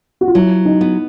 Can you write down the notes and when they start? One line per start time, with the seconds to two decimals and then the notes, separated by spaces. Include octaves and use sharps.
0.21 F#4
0.28 F4
0.35 F#3 E4
0.65 D#4
0.81 B3